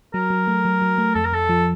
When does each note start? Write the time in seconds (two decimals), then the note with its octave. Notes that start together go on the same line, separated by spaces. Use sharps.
0.14 F#3 A#4
0.30 F#3
0.47 A3
0.65 F#3
0.82 F#3
0.98 A3
1.15 F2 A4
1.25 A#4
1.33 F2 A4
1.49 F3